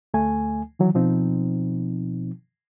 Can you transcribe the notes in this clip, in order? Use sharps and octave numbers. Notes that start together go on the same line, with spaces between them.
D2 A3 G#5
D#3 E3 F#3
B2 F3 C4 D#4